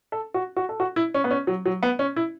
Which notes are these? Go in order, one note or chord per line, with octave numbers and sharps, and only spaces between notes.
A4
F#4
F#4
A4
F#4
E4
C#4
B3
C#4
F#3
F#3
B3
C#4
E4